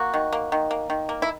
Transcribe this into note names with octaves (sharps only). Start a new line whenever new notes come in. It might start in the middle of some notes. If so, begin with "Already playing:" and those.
Already playing: A#3 F#4
D#3
A#3
D#3
A#3
D#3
A#3
E4